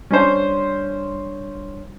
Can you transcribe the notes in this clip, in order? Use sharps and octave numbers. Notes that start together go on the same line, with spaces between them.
G3 C#4 D4 C5 C#5